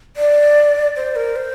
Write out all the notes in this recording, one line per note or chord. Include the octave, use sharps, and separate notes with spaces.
D5
C5
A#4
C5